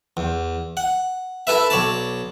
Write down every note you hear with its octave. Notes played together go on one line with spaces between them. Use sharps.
E2
F#5
E4 A4 B4 E5
B1 C#5 D5 A5